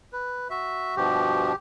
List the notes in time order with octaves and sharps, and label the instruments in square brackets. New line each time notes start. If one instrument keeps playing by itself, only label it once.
[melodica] B4
[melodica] F#4 [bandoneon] E5
[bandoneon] G2 B2 F3 [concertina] G4